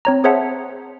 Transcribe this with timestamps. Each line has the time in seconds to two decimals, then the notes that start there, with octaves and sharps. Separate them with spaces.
0.05 C4 C#5 A#5
0.24 G#4 C5 C#5 E5 F#5 A5